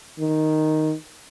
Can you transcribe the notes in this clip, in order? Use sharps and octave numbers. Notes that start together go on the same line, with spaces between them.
D#3